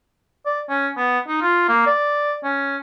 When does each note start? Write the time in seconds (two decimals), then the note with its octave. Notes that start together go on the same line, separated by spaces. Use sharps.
0.46 D5
0.70 C#4
0.97 B3
1.28 D#4
1.41 F4
1.68 A#3
1.86 D5
2.44 C#4